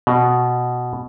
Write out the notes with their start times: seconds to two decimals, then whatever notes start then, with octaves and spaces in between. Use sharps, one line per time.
0.07 B2